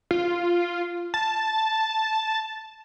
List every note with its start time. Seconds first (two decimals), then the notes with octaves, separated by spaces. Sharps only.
0.11 F4
1.14 A5